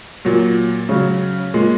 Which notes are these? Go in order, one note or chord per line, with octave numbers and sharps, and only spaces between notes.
A#2 F#3
C#3 F#3 C#4
A#2 G#3